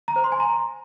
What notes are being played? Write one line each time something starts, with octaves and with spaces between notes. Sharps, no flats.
A#5
C5
C6
G#5
A#5